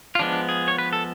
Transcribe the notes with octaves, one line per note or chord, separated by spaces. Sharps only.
F4
F3 G#3 B3 D4
G#4
C#5
B4
A4